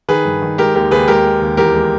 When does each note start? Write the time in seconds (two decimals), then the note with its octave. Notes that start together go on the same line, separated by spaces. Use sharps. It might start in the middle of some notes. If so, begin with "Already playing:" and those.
0.08 D#3 G#4 B4
0.25 G2
0.42 D#3
0.58 G#3 G4 A#4
0.75 D#2 G4 A#4
0.91 D#2 G#4 B4
1.08 G#3 G4 A#4
1.24 G#3
1.42 D#2
1.57 E2 G4 A#4
1.74 G#3